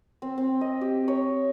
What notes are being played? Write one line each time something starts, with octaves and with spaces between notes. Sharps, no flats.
C4
C4
D#5
G4
C#5